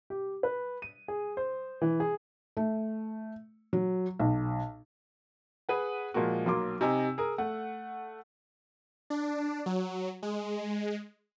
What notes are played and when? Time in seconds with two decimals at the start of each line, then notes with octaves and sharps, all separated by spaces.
0.10 G4
0.43 B4
0.82 D#7
1.08 G#4
1.37 C5
1.81 E3
2.00 G#4
2.57 A3
3.73 F#3
4.19 B1
5.69 G#4 B4 F#5
6.14 A#2 F3 G#3 A#3 F#4
6.46 B1 F#3 A#3 C6 D6
6.81 C3 D#4 G#5 A#5 E6
7.18 G#4 A#4
7.38 A3 F#5
9.10 D4
9.66 F#3
10.23 G#3